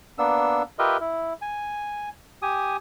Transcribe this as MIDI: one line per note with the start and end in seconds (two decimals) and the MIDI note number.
0.18 0.63 58
0.18 0.63 59
0.18 0.63 62
0.18 0.63 88
0.79 0.97 65
0.79 0.97 67
0.79 0.97 70
0.79 0.97 71
0.79 0.97 75
0.79 0.97 76
1.00 1.33 64
1.42 2.09 80
2.42 2.77 67
2.42 2.77 80
2.42 2.77 87